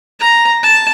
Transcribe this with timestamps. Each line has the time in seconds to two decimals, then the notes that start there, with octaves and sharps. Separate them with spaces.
0.20 A#5
0.63 A5